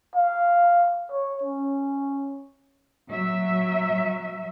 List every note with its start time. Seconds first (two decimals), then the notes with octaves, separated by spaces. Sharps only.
0.15 F5
1.12 C#5
1.43 C#4
3.10 F#3 E5